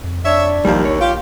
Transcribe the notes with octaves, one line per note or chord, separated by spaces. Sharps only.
F2
D4 C#5 E5
A#1 D#2 F3 G3
C#5
F4 G4